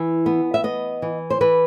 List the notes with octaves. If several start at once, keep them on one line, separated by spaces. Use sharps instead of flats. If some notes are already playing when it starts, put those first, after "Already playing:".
Already playing: E3
B3
E5
B3 D#5
E3
C5
E3 B4